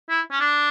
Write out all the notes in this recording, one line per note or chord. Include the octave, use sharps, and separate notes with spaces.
E4
C#4
D4